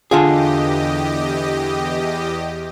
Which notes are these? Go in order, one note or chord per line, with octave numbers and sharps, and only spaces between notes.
E2 D3 F4 G4 G#4 D#5